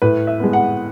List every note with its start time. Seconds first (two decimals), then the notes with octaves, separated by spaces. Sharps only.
0.02 A2 B4
0.27 E5
0.40 G#3 B3
0.53 F#5